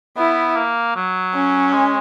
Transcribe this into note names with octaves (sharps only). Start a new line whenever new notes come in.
B3 E4
A#3
F#3
C#4
G#3